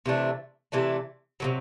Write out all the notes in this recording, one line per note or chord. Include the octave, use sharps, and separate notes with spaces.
C3 E3 A3 D4
C3 E3 A3 D4
C3 D#3 F#3